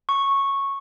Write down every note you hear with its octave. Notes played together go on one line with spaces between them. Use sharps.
C#6